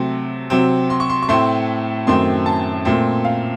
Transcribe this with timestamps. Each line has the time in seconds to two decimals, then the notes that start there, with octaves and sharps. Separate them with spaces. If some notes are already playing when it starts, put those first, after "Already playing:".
Already playing: C3 F#3 A3 C4
0.50 C3 F#3 C4
0.90 C6
1.00 C#6
1.10 C6
1.23 C#6
1.29 A2 A3 C4 C6
2.07 F#2 D#3 A3 C4 C6
2.46 A5
2.85 A#2 A3 C4
3.25 F5